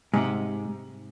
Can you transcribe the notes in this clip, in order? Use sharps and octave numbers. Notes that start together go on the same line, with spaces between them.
G#2 C3